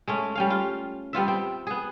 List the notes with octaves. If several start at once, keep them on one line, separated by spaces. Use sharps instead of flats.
G#3 A3 C#4
G3 C#4 F5
F4 F5
G3 B3 F4 E5
C4
B3 G#4